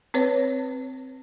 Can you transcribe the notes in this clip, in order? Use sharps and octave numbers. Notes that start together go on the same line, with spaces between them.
C4 B4 C#5